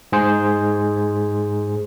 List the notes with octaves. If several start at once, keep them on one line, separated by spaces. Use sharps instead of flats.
G#2 G#4 C5